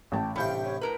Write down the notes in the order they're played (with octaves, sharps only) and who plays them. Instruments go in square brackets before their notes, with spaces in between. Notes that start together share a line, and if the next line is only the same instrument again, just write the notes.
[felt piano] A1 A5 [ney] G5
[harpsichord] A1 C3 G5 [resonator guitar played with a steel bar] G2 [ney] F5 [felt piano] B5 G6
[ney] C#5
[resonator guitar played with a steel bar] A2 A#4 B4 [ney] A#5